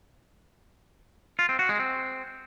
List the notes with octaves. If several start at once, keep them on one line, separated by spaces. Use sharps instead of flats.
F4
C4
F#4
G#3
C4